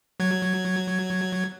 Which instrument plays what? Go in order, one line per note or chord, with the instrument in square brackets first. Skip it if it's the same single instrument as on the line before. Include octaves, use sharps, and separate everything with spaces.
[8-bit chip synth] F#3 G#6